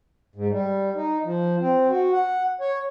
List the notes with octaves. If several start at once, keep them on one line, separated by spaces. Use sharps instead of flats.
G#2
G3
D#4
F3
C4
F#4
F#5
C#5